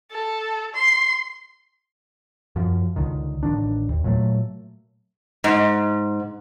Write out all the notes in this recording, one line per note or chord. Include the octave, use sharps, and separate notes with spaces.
A4
C6
F#2 F3
C#2 D3 D#3
A1 D#3 D4
D#2
A#2 F#3 A3
G#2